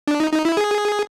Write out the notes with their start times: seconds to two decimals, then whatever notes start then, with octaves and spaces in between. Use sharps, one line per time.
0.08 D4
0.20 D#4
0.32 D#4
0.45 E4
0.57 G#4